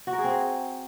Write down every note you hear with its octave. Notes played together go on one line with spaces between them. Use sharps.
F#4
A#4
G#4
C4
G#4